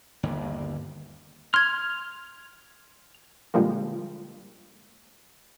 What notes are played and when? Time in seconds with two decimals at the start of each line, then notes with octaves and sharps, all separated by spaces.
0.23 G1 D#2
1.54 C6 F6 G#6
3.54 A#2 D3 F3 G3 G#3 A#3